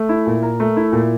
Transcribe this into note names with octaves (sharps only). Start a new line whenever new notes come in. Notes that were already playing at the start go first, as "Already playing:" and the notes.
Already playing: A3
E4
A#2
A#4
A3
E4
A#2